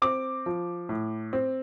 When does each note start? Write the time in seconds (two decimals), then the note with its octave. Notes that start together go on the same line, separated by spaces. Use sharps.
0.02 C4 D6
0.46 F3
0.89 A2
1.33 C4